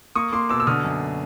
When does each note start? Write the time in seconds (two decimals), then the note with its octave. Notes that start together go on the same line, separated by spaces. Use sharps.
0.15 A#3 C#6 D#6
0.32 A#3 C6 D6
0.49 B2 D6 E6
0.60 E6
0.67 D3 D#6 F6
0.84 F#2